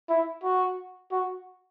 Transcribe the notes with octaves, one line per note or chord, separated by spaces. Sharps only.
E4
F#4
F#4